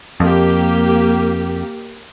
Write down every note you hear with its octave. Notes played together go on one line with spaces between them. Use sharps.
F2 A#3 G4